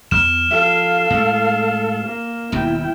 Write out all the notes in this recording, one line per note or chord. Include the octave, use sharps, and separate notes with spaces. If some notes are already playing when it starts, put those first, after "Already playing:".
E2 F6 E7
F3 A4 F5
A2 G#3
A#3
D#1 D#2 B2 E4 G5